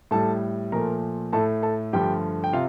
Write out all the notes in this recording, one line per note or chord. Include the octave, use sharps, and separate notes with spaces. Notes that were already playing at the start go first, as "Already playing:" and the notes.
A2 G3 A4 A5
A#2 F3 A3 A#4 A#5
A2 A3 A4 A5
A4 A5
G2 D3 F3 A3 G4 G5
G5
C3 F4 F5